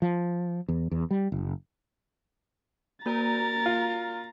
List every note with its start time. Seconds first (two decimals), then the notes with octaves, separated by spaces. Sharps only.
0.02 F3
0.68 E2
0.91 E2
1.11 G3
1.32 F#1
3.06 A#3 F#4 A#4 D5 A#5 A6
3.66 F4